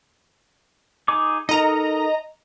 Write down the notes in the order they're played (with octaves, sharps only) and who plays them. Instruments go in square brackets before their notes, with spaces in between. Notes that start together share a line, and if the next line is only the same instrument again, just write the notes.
[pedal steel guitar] D#4 G#4 D6
[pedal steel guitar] D#4 A4 A#4 [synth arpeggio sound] D#5 A#5